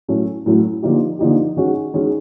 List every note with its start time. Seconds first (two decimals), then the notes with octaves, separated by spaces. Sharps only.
0.08 A2 F#3 A3 C#4
0.46 A2 F#3 A3 C#4
0.82 D3 F3 A#3 D#4 G4
1.19 D3 F3 A#3 D#4 G4
1.56 D#3 G#3 C#4 F#4
1.94 D#3 G#3 C#4 F#4